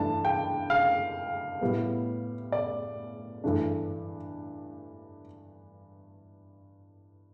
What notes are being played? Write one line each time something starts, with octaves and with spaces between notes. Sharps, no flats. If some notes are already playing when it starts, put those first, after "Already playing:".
Already playing: G2 E3 A3 D4 A5
G5
F5
A2 G3 B3
D5
G2 E3 A3 D4